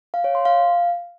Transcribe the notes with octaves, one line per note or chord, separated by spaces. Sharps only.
F5
C#5
C6
F5